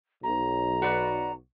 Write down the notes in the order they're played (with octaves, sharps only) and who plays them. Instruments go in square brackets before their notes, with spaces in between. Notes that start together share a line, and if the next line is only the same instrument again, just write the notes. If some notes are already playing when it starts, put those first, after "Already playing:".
[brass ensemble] B1 [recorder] A#5
[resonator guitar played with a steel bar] F#4 B4 D5